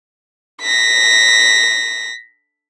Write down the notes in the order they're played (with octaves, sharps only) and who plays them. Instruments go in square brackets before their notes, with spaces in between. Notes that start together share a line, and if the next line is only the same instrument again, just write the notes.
[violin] A#6 B6